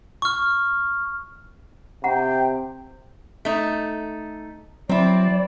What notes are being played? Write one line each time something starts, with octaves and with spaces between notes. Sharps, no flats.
C#6 F6
C3 F#5 G5 A#5
A3 D#4
F#3 C4 E4 D5